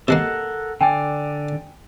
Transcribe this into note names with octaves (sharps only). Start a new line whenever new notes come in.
C3 G#3 A#3 A4 A#4 F#5
D3 D5 G5 G#5